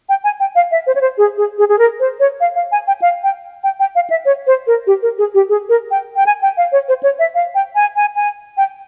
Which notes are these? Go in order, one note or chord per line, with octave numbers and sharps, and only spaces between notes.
G5
G#5
G5
F5
E5
C5
C#5
C5
G#4
G#4
G#4
G#4
A#4
C5
C#5
F5
F5
G#5
G5
F5
G5
G5
G5
F5
E5
C#5
C5
A#4
G4
A#4
G#4
G4
G#4
A#4
G5
G5
G#5
G5
F5
C#5
C5
C#5
E5
F5
G5
G#5
G#5
G#5
G5